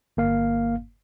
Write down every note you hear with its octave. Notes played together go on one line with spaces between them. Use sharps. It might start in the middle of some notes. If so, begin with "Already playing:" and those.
G1 A#3 F5